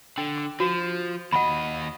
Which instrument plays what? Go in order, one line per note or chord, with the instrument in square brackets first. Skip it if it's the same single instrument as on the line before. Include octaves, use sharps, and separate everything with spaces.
[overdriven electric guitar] D3 [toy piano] G5
[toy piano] D6
[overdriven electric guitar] F3 [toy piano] F#4
[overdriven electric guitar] D#2 D#5 [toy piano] F#5 B5